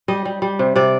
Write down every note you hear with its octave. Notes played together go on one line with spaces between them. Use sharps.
G3 D#5
G3
G3
C3
C3 D5